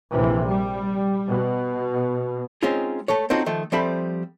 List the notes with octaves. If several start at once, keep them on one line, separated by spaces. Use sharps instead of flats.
A#1 C3 E3
G3
B2
G#3 C4 C#4 D#4 F4 G#4
A3 A4 C#5
C4 C#4 D#4 F4 F#4 A4
D#3 F3 A3
F3 G3 C4 A4 E5 B5